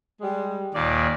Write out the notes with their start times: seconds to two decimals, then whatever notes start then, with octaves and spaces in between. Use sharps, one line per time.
0.21 G3 G#3
0.74 D#2 A#2 D5